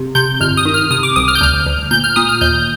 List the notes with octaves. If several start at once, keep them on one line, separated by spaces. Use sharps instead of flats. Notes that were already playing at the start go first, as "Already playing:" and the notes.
Already playing: C3
C3 G6
G1 F6
D#6
D#3
F6
C3 D#6
D6
C2 D#6
F6
G6
D2 F6
D2
A#2 G6
F6
A#2 D#6
F6
D#2 G6